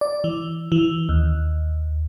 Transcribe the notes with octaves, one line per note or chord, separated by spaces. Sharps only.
D5
E3
E3
D#2